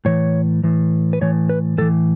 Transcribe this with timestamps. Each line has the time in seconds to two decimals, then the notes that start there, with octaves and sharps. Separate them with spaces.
0.05 A2 E3 C#5
0.64 A2 E3
1.13 B4
1.21 A2 E3 C#5
1.49 B4
1.78 A2 E3 A4